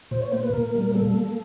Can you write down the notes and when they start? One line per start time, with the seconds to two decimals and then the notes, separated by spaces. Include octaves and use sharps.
0.11 A#2 C5
0.22 C#5
0.32 A#3 C5
0.43 B4
0.53 A#2 A#4
0.75 G3
0.95 A#3 A4
1.17 A#3